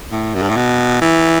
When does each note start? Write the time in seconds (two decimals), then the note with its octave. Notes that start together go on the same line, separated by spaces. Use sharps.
0.12 A2
0.35 F#2
0.42 G2
0.49 A2
0.56 B2
1.01 E3